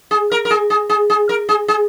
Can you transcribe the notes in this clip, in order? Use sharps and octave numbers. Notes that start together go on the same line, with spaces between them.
G#4
A#4
A#4
G#4
G#4
G#4
G#4
A#4
G#4
G#4